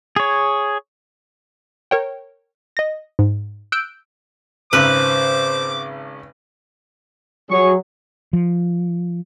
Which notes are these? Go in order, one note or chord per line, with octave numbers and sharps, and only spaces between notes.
G#4 C#5
A#4 C#5 G5
D#5 A#6
G#2
E6 F#6 G6 D7
G#1 C#3 B4 C5 D6 E6
F#3 G#4 C#6
F3